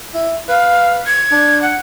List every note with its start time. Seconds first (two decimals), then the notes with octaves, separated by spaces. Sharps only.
0.14 E4
0.49 B4 F5
1.07 G#6
1.32 D4
1.62 F#5